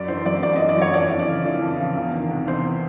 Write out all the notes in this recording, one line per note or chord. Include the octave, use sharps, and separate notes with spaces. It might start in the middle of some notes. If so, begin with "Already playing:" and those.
Already playing: F#2 D5
E3 C5
F#2 D5
F#2 D5
D#5
E3
D5
F#2 C#5
F2 D5
E3
D5
C#3
E3
F2
C#3
E2
D#3
C3
E2 C5